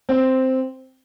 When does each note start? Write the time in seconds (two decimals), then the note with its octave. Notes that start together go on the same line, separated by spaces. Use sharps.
0.09 C4